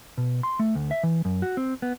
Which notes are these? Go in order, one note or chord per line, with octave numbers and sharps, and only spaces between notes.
B2
C6
A3
D2
E5
E3
F#2
F#4
C4
B3